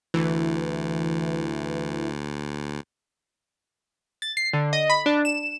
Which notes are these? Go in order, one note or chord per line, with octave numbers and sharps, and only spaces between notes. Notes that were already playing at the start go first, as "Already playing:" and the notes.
D2 E3
A6
C7
D3
D#5
B5
D4
E7